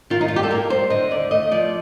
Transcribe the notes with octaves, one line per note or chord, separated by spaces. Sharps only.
D#3 F4
D#4
G2 F4
G4
A4
A#3 A#4
G3 C5
D3 D#5
D#2 D5
A3 D#5
F3 D5